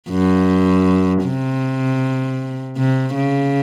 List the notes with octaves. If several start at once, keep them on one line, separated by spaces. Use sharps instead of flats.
F#2
C3
C3
C#3